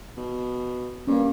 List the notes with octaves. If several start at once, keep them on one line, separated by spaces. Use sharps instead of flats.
B2
G2 A#3 C#4